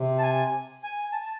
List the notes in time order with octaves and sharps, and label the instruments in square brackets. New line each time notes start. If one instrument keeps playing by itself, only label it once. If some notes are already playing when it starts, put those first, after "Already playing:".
Already playing: [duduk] C3
[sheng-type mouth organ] A5
G#5
G#5
A5